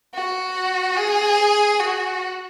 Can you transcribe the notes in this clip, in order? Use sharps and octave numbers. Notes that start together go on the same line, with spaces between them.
F#4
G#4
F#4